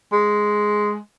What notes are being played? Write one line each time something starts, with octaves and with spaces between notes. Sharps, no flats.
G#3